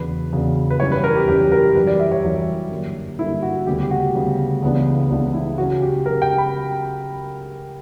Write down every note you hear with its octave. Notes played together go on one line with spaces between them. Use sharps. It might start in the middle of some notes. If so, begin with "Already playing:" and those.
Already playing: E2 C#3 F#3 B3 D4 B4
E2 C#3 F#3 B3 D4
B4
F#2 E3 G3 C#4 C#5
B4
A#4
G4
F#2 E3 G3 C#4 G4
A#4
F#2 E3 G3 B4
D5
E5
C#5
F#2 E3 G3
G2 D3 A#3
G2 D3 A#3 E4
F#4
D2 C#3 G3 B3 G4
G4
F#4
D2 C#3 G3 B3
C#2 C#3 E3 B3 D4
C#2 C#3 E3 B3 D4
E4
C#3 F#3 C#4 F#4
G4
C#3 F#3 C#4 A#4
G5
B5